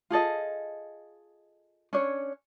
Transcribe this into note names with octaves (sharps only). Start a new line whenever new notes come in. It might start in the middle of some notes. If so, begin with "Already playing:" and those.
F4 G#4 A4 D#5
C#4 D4 C#5